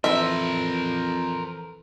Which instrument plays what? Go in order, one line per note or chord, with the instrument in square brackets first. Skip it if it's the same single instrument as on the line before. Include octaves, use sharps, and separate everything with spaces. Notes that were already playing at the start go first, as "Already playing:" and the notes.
[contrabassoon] F2 [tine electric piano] E3 A4 [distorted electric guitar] A#4 C5 [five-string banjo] E5